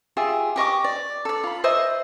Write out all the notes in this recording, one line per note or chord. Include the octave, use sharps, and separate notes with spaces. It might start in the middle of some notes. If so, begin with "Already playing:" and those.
F4 G4 G#4 E5
G4 D#5 C#6 D6
D5
A4 D5
F4 B5
C5 D#5 E5